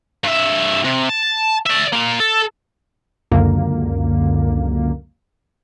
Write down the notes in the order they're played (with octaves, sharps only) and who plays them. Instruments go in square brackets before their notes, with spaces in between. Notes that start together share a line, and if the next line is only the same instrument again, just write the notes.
[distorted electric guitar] G2 E5
C3
A5
D5 E5
A#3 F4
A4
[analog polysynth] C#2 F#2 D3 A#3